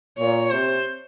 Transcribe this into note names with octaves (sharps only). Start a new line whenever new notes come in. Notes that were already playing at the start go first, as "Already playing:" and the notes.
A#2 C#5
C3 C5